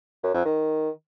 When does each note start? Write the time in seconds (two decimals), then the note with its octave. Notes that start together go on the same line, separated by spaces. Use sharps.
0.23 F#2
0.34 F2
0.45 D#3